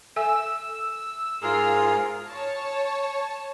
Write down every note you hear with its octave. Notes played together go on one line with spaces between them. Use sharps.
A4 E5 G#5 E6
G#2 F4 G#4 A#4
C#5 A5